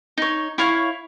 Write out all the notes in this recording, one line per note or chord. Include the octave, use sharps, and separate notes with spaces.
D#4 C#5
E4 C#5 F5 C#6